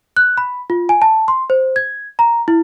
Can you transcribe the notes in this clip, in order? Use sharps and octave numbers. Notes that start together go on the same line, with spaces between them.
F#6
B5
F4
G#5
A5
C6
C5
G#6
A#5
E4